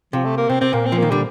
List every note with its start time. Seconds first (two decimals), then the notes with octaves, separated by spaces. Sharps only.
0.13 C3 F3
0.24 A3
0.37 A#3
0.49 C3 C4
0.61 C3 C4
0.73 A#2 A#3
0.85 C4
0.92 F3
0.98 D#3 A#3
1.10 D3 G3